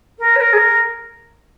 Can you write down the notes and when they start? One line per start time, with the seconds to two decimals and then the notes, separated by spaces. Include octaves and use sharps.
0.18 A#4
0.35 C#5
0.40 A#4
0.52 G#4
0.57 A#4